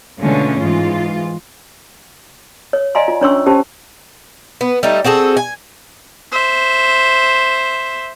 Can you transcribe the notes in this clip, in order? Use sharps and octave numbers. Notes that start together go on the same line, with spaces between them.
B2 D3 G#3 A3 C#4 F4
G#2 E3 F4
C#5
D5 D#5 F5 G#5 A#5 C6
F4
C#4 D4 C#5 C6 C#6 E6
C#4 G4 C5 A5 B5
B3
G3 A3 D#4
C4 F#4 G#4 A4
G#5
C5 E5